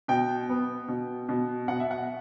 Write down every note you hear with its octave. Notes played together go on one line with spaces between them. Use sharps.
B2 G5
B3
B2
B2
B2 F#5
E5
F#5